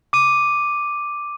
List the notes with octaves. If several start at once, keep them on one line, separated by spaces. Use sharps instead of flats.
D6 D#7